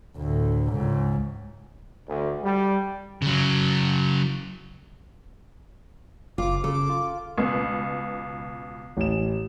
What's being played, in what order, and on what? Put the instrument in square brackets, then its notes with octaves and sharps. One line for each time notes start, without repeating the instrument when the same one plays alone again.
[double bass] D2 A2
C#2 G#2
[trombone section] D2
G3
[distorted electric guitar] C#3 F#3
[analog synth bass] F#1 [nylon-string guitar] F4 [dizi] D6
[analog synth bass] C#3 [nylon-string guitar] A4 [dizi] D6
[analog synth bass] F4
[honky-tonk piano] C#2 B2 B4
[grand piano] A1 E7